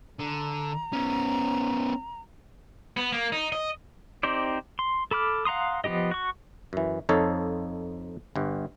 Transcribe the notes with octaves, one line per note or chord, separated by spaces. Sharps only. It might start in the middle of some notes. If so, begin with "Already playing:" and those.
D3 A#5
B3 C#4
B3
A#3
D#4
D#5
C4 D#4 G4 C5 D5
C6
A4 B5 D6 F6
F5 F#5 A#5 C6 D#6
F3 B3 E4 G4 D#5
F#4 C#6
F#2 E3
F2 F3 D#4 A4 C#5 F5
G1 G2